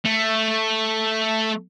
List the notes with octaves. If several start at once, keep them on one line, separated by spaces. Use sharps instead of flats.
A3